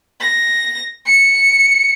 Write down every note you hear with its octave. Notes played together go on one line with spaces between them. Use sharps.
A#6
C#7